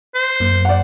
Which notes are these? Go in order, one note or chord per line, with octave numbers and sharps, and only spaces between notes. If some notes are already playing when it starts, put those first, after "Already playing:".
C5
F#2 A#3
D5 F#5